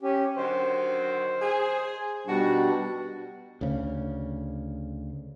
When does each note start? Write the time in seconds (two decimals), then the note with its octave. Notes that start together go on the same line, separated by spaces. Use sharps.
0.02 C#4 G4
0.37 D3 D#3 F#3 C5
1.41 G#4
2.27 B2 D#3 G3 D4 F#4
3.61 D2 C#3